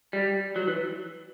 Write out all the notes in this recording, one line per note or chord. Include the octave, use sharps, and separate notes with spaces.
G3
F#3
E3